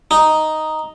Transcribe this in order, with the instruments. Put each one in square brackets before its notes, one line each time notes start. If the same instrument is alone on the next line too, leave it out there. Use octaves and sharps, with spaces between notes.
[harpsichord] D#4